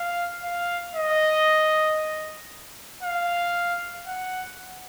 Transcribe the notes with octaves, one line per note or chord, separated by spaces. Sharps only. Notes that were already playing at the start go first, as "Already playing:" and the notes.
Already playing: F5
F5
D#5
F5
F#5